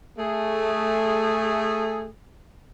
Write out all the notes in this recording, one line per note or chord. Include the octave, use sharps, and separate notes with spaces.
A3 G#4